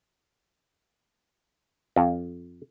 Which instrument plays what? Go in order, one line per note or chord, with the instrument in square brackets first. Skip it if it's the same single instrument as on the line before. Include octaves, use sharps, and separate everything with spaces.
[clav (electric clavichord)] F2